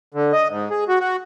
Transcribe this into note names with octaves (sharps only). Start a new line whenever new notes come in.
D3
D#5
G#2
G#4
F#4
F#4